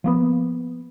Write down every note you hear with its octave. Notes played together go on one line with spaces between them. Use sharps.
F3 A#3 B3